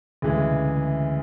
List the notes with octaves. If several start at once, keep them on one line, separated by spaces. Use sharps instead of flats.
D2 C#3 E3 G#3